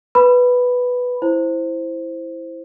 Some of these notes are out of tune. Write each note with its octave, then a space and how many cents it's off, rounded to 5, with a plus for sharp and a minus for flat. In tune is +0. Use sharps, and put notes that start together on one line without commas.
B4 +0 B5 +0
E4 +0 C5 +0